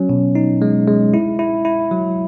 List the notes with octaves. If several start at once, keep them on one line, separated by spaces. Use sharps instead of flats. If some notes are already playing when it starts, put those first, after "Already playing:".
Already playing: F#3 C#4
B2
D#4
G#3
G#3
E4
E4
E4
F#3